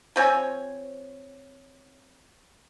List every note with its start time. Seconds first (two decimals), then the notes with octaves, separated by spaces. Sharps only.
0.16 F3 C4 C#5 G#5